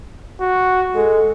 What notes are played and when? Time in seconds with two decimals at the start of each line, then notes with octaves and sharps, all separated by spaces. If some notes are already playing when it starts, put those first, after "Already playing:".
0.40 F#4
0.95 G#3 A4